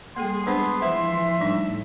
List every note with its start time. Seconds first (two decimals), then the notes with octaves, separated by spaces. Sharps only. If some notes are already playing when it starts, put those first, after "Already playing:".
0.16 G3 A#3 G#4 A4 G5 C6
0.47 G#3 B3 D4 C5
0.82 E3 F3 C5 E5 B5
1.41 A2 G3 D4 D#4